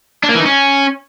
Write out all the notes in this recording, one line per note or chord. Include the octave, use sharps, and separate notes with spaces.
D4
A#3
E3
D#4
C#4